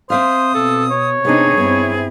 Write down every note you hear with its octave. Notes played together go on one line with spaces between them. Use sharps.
C4 C5 E5 F5 D#6
B2 A4
C#5
C3 B3 C4 D4 D#4 G#4
G2 B3 C4 E4